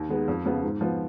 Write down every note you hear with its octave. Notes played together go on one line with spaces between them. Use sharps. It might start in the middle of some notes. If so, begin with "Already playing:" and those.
Already playing: D#2
D#3 G#3 B3
F2
C#3 F3 B3 F4
G#2
F3 B3